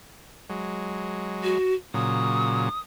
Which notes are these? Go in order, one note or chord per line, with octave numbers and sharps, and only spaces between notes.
F#3 G#3
F#4
A#2 C#3 F#3 D#6